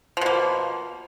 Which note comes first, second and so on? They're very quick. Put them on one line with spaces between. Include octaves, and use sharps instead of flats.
F3 B2 A#3